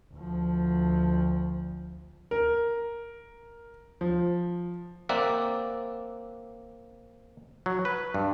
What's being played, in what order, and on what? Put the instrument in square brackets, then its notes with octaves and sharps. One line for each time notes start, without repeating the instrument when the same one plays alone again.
[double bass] D2 F3
[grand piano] A#4
F3
[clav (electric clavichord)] A#3 C4 D5 E5 F#5
F#3
B4
G2